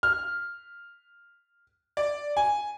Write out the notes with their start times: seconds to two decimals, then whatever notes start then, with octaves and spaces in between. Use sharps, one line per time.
0.03 F6
1.97 D5
2.37 G#5